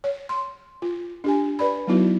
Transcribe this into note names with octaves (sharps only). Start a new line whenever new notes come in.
C#5
C6
F4
D4 G4 G#5
B4 D5 B5
F#3 B3 D#4 E4 F#4